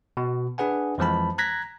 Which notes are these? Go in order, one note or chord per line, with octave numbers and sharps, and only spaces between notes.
B2
D4 G#4 B4 F#5 G#5
F2 E3 F3 G#3 A5 B5
A#5 F#6 G#6 A#6 B6